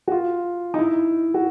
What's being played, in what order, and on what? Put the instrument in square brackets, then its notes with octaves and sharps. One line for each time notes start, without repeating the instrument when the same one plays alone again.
[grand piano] F#4
F4
D#4
E4
F#4